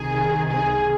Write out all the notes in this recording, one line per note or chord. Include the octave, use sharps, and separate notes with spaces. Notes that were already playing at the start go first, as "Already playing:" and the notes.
Already playing: C2 C3 D#3 G#4
G#4